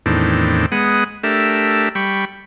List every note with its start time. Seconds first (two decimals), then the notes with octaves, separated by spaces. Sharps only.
0.06 E2 A2 D#3 C4 D4
0.72 G#3 B3 F#5 D#6
1.24 A3 D4 G4 A#4 E5
1.95 G3 G5 B5 C#6